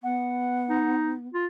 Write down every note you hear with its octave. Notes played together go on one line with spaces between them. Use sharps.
B3 F#5
D#4
F4